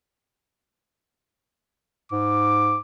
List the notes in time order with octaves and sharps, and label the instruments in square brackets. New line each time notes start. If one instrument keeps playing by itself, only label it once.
[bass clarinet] G#2 [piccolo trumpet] D6